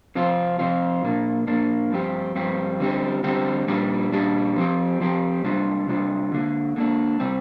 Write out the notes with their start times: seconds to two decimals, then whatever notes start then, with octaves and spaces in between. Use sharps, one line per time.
0.15 C3 F3 C4 F4
0.59 C3 F3 C4 F4
1.03 A#2 A#3 D4
1.47 A#2 A#3 D4
1.92 G2 F3 C4 G4
2.35 G2 F3 C4 G4
2.80 D3 G3 C4 G4
3.24 D3 G3 C4 G4
3.68 A#2 G3 D4 G4
4.12 A#2 G3 D4 G4
4.56 F3 C4 G4
5.00 F3 C4 G4
5.44 C3 G3 D4 F4
5.88 C3 G3 D4 F4
6.32 D3 A#3 D4
6.76 D3 A#3 D4
7.20 C3 G3 C4